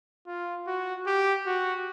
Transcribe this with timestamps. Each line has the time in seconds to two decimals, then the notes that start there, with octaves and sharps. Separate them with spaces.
0.27 F4
0.67 F#4
1.07 G4
1.47 F#4